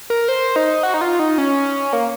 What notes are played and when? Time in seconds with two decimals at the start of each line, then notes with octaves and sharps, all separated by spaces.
0.10 A#4
0.28 C5
0.56 D#4
0.83 F#4
0.94 D#4
1.01 F4
1.19 D#4
1.38 C#4
1.93 A#3